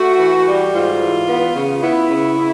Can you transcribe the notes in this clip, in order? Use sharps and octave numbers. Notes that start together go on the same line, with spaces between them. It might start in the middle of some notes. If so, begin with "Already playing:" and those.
Already playing: A3 F#4
E3
G3
G#2 F4
E3
B3
C#3
B3 E4
C#3
C#3